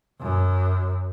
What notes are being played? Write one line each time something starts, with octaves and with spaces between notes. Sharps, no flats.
F#2